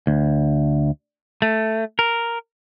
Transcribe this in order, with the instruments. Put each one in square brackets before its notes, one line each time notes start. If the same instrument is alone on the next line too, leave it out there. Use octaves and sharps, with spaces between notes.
[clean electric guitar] D2
A3
A#4